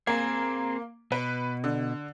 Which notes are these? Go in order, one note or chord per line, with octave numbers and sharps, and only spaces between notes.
A#3 C4 G#4
B2 B4
D3